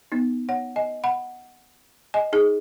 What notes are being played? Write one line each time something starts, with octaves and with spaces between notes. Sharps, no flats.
B3 D#4
C#5 F#5
D#5 G#5
F#5 B5
D#5 G#5
D#4 G#4